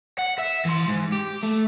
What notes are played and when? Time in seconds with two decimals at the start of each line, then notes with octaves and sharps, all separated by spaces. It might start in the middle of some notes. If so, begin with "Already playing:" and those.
0.18 F#5
0.38 E5
0.65 E3 C6
0.88 G#2
1.12 G4
1.43 A3